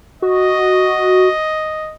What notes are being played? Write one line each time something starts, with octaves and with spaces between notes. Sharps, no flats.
F#4 D#5